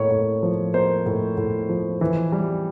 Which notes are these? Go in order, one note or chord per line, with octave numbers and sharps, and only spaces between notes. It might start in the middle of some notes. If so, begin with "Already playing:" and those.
Already playing: A2 A#3 C#5
A2
F3
A#3 C5
A2
A2
F3
E3
G3